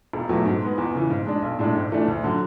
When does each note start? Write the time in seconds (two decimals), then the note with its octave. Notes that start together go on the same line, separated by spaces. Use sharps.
0.13 E1
0.29 E2 B2 F#3 A3
0.46 G#2
0.62 G#3 B3
0.78 E2
0.95 C#3 E3
1.10 G#2
1.26 G#3 D4
1.42 B1
1.59 A2 G#3 D4
1.75 G#2
1.92 E3 A3 D4
2.08 D2
2.24 D3 F#3